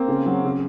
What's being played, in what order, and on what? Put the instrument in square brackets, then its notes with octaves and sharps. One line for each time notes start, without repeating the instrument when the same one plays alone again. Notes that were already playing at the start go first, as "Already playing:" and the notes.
Already playing: [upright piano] A#3 C4
C#3
F#3
C#3